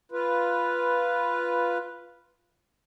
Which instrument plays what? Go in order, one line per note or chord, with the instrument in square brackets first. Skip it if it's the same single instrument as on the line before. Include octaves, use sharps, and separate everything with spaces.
[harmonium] F4 B4